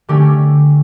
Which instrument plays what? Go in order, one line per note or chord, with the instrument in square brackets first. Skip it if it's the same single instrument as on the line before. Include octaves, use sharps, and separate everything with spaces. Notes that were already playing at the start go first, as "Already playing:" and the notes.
[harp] D3 A3 C#4 G4